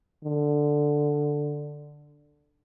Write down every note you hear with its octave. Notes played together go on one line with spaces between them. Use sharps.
D3